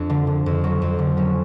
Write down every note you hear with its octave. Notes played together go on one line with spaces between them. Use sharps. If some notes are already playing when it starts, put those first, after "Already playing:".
Already playing: F2 D4
D3
D3
F2
F#3
F2
D3
F#3 C#4